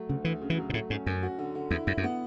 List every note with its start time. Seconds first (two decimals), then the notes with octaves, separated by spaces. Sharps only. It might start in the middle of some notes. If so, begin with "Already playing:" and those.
Already playing: F#3 A3
0.09 D2 C#3
0.25 D2 E3
0.42 C#3
0.50 E3
0.58 F#3
0.70 B2
0.74 A2 A3
0.90 G#2 C#4
1.06 F#2 C#4
1.23 F#4
1.39 D3
1.55 D3
1.71 E2 E4
1.87 F#2 E4
1.97 F#2
2.04 B3